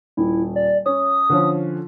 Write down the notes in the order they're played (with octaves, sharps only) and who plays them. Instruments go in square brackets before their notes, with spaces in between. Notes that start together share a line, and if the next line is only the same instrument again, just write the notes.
[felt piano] D#1 [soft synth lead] E4
[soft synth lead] D5
[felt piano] C#4 [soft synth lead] D#6
[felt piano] D3 F3 C#4